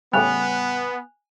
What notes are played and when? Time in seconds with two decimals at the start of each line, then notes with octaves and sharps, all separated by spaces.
0.13 A2 C#3 G3 B3 G#5 F#6 F7